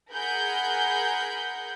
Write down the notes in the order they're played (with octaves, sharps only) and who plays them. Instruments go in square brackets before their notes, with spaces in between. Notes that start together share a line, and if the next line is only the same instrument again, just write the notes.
[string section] G#4 A#4 F#5 G#5 B5 G6